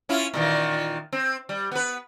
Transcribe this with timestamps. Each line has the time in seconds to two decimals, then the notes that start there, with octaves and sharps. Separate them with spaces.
0.09 C#4 E4 F4
0.34 A#2 D#3 E3
1.13 C4
1.49 G3
1.72 B3 B4